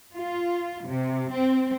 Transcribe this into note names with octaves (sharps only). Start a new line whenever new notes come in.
F4
C3
C4